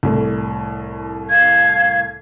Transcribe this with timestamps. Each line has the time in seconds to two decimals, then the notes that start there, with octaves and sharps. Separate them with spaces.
0.03 C2 A2
1.29 F5 G#6